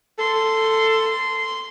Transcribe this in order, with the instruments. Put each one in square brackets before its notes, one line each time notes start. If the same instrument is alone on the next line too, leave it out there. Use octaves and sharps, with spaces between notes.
[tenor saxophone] A4 [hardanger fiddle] C6